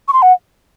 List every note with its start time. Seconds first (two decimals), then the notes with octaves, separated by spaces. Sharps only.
0.08 C#6
0.13 C6
0.22 F#5